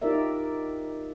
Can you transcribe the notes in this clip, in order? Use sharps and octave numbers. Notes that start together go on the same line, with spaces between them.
D#4 F4 G4 A#4 D5 E5